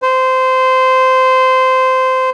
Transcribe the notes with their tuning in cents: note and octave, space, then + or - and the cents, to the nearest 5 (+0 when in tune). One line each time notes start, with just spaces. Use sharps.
C5 -15